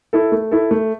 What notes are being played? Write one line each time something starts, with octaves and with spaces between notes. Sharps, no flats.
E4 A4
A3
E4 A4
A3